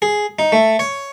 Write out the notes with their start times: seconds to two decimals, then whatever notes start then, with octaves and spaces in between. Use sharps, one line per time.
0.02 G#4
0.39 D#4
0.52 A3
0.79 C#5